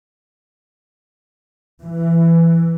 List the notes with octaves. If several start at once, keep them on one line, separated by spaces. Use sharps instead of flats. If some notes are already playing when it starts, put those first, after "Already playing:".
E3